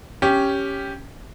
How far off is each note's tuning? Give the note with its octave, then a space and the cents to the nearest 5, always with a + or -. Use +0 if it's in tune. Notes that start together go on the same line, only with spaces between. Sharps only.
C#4 +0 G4 +0